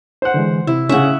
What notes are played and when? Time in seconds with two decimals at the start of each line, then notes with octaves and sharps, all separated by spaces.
0.22 C5 F#5
0.34 D3 E3 G#3
0.67 C3 E4 E6
0.89 C#3 C#4 E5 F#5